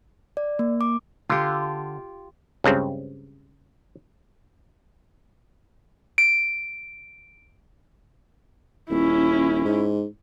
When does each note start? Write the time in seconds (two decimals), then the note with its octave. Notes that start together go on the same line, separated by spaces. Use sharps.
0.37 D5
0.59 A#3
0.81 D6
1.30 D3 F4 G4
2.64 C#2 G2 C#3 C4
6.18 D7
8.90 D#1 C#4 E4
9.65 G#2